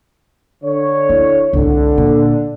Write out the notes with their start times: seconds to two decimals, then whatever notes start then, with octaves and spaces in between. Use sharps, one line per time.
0.63 D3 C#5
1.09 E4
1.53 C2 G#2 D3
1.98 A#2